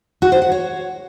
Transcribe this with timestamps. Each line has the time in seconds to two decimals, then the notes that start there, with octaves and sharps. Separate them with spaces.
0.22 F#4
0.32 C5
0.42 F#5
0.52 C#5